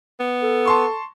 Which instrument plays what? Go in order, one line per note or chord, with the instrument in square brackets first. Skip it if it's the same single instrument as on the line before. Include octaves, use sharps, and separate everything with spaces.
[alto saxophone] B3
[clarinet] A4
[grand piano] A5 C6 C#6